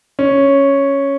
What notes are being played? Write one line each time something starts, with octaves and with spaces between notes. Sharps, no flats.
C#4